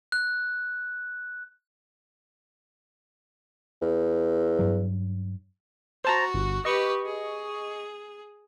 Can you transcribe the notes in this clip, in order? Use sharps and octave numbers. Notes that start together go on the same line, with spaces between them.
F#6
E2
G2 F#3
F#4 C5 A5 A#5
G1
G4 B4 D#5 C#6
G#4